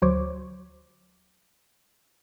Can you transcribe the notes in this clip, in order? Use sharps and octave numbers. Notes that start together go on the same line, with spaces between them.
D2 F#3 C5 C#5 D6